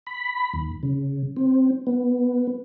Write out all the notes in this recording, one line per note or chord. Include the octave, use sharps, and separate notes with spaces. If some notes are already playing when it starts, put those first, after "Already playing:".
B5
D#2
C#3
C4
B3